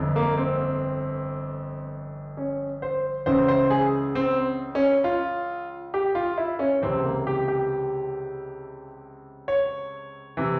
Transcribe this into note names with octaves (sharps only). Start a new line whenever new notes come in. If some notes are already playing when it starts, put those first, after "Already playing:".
Already playing: G1 F2 E3
A#3
C4
C#4
C5
C#2 C#3 E3 C5
C5
G#4
C4
C#4
F4
G4
F4
E4
C#4
C#2 C3 E3 C4
A#3
G4
G4
C#5
C3 E3